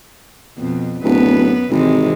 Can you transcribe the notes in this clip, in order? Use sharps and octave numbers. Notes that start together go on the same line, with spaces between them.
F2 B2
D1 F#2 B3 B4
G#1 C3 E3 G#3